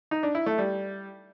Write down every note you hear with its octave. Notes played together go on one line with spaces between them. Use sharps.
D#4
D4
E4
A3
G3